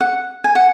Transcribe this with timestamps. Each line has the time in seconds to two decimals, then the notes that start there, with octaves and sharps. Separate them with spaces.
0.01 F#5
0.44 G#5
0.55 F#5